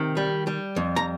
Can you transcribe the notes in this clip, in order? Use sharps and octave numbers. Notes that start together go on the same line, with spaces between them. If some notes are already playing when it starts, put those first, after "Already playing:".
Already playing: C3 D#3
G3
G3
F2
A#5